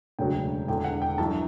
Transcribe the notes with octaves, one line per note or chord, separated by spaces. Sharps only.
E1 D2 C#3 F#3 G5
E1 E2 D3 G5
F#5
G5
G1 F#2 E3 A5